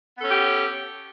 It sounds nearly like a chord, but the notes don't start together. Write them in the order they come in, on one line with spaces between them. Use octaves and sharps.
B3 A4 C#4 G4